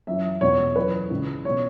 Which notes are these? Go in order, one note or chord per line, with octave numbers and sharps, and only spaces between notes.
F#2 E3 E5
E2 B2 C#5
F#2 E3 B4
C#2 C#3 E3
B2 C#5